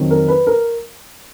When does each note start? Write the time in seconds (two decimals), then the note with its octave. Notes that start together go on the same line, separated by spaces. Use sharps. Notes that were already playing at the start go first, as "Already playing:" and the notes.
Already playing: F2 D#3 F#3
0.11 A#4
0.28 B4
0.47 A#4